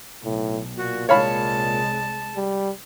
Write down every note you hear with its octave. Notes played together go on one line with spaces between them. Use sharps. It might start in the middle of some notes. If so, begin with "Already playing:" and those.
B1 A2
A#2 F#4
C2 G#3 C#5 F5 A5 B5
G3